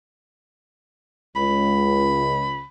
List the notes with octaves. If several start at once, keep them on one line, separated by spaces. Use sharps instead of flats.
C#2 B5